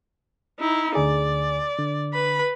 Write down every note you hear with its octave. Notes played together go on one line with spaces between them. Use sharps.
D#4 E4
D2 D3 G#4 D5
D3
B4 B5